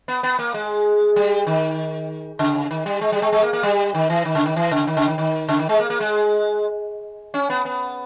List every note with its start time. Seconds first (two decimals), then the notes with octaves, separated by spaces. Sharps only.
0.08 B3
0.23 B3
0.39 A#3
0.54 G#3
1.16 G3
1.46 D#3
2.39 C#3
2.71 D#3
2.86 G3
3.01 G#3
3.12 G3
3.22 G#3
3.32 G#3
3.42 A#3
3.53 A#3
3.63 G3
3.94 D#3
4.10 E3
4.25 D#3
4.35 C#3
4.46 D#3
4.56 E3
4.71 C#3
4.87 D#3
4.97 C#3
5.08 D#3
5.18 D#3
5.49 C#3
5.59 D#3
5.69 G#3
5.80 A#3
5.90 A#3
6.00 G#3
7.34 C#4
7.50 B3
7.65 B3